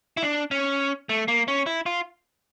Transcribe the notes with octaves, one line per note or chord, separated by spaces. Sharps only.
E4
D4
C#4
A3
A#3
C#4
E4
F4